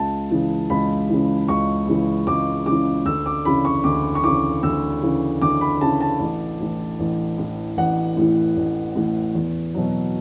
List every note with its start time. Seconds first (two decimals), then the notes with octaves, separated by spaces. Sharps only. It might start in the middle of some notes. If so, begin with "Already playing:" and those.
Already playing: C#2 A5
0.31 C#3 E3
0.70 C#2 B5
1.09 C#3 E3
1.48 C#2 C#6
1.88 C#3 E3
2.27 C#2 D6
2.66 C#3 E3 D6
3.05 D2 E6
3.26 D6
3.45 C#3 E3 B5
3.65 C#6
3.84 D2 D6
4.15 C#6
4.23 C#3 E3 D6
4.63 D2 E6
5.02 C#3 E3
5.42 D2 D6
5.61 B5
5.81 C#3 A5
5.85 E3
6.01 A5
6.20 A1
6.60 A2 E3
7.00 A1
7.38 A2 E3
7.77 A1 F#5
8.17 A2 E3
8.57 A1
8.96 A2 E3
9.35 E2
9.74 B2 F#3